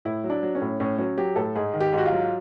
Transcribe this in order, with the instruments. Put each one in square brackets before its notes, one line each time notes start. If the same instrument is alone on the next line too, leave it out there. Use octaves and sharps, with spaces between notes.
[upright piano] A2 E4
F#3
D4
F#3
C#4
A2
A2 C#4
F#3 C#4
F#3 G4
A2 A4
G#2 G#4
D#3
G4
G#2
F#4
F4
F#3